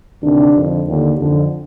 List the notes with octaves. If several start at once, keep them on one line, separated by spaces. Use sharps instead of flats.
D2 C3 D#3 D4
F2 D3
D#2 D3
F2 D3